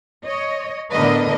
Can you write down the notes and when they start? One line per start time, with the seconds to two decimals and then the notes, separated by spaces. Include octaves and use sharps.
0.24 C#5 D#5
0.91 A2 D3 B3 A#4 B4 D#5